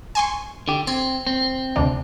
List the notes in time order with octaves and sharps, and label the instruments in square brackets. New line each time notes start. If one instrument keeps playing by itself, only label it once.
[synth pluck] G#5 C6 C#6
[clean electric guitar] D3 G4
[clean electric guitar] C4 [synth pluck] G#6
[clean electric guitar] C4
[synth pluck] D2 C3 D4